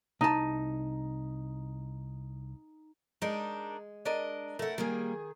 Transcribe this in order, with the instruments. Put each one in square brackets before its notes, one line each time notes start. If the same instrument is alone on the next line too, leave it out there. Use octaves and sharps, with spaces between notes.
[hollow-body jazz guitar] C2 A5 [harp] D#4
[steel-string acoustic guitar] G#3 [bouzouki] D4 D#4 A#4
[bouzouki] D4 A#4 D#5
[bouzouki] A3 E4 [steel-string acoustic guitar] A#4 F#5
[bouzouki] D#3 G#4 [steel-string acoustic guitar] G3 A#3